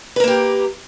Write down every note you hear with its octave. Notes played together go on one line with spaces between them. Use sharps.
A#3 G4 A#4 B4